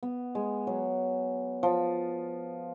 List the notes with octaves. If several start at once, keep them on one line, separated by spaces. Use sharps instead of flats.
B3
G#3
F#3
F3